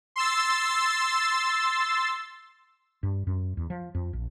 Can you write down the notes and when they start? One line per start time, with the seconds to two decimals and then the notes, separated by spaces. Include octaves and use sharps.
0.16 C6 E6 A6
3.03 G2
3.27 F#2
3.57 E2
3.70 F3
3.95 F2
4.13 A#1